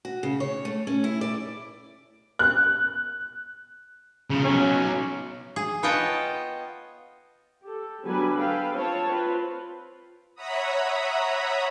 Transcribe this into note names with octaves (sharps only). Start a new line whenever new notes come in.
F#4
C#3
C#5
A3
C#4
E4
D5
F#6
C#3 F3
B1 F#3 C#4
G#4
B3 F4 C#5 D#5 G5 A5
G4 A4
D3 F#3 G3 B3 B4 G#5
A4 B4 F5 G5
C4 F4 C#5 A5
C4 F4 B4
C#5 E5 F#5 A#5 B5 D#6